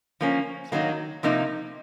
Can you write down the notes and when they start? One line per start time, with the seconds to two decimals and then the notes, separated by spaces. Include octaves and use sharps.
0.21 F3 A#3 C#4
0.72 D#3 F#3 A#3
1.23 C3 F3 A#3 D#4